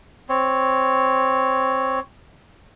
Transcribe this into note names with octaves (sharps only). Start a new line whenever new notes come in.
C4 C#5